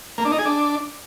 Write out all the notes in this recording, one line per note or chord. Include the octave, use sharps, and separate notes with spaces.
A#3
D4
D#4
G#4
D4